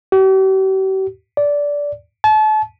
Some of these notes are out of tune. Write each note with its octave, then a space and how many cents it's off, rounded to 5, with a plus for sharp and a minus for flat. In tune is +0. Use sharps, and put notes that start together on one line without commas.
G4 -45
D5 -15
A5 -35